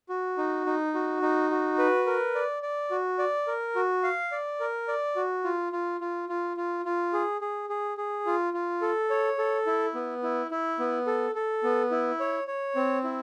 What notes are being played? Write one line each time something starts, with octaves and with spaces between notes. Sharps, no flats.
F#4
D#4
D#4
F#4
D#4
F#4
B4
A#4
D5
D5
F#4
D5
A#4
F#4
F5
D5
A#4
D5
F#4
F4
F4
F4
F4
F4
F4
G#4
G#4
G#4
G#4
F4
F4
A4
C#5
A4
E4
B3
E4
E4
B3
A4
A4
B3
E4
C#5
C#5
C4
E4